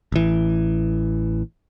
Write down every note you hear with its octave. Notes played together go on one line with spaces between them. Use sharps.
A1 E3